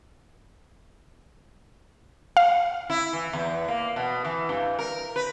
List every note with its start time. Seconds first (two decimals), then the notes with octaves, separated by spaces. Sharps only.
2.37 F5
2.90 E4
3.13 E3
3.33 E2
3.68 A#3
3.96 B2
4.25 E3
4.49 G2
4.79 A#4
5.16 B4